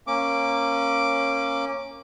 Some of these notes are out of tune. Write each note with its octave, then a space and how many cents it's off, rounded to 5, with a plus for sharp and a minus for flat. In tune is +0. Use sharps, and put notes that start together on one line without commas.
A#3 -5 C#4 -15 D6 -5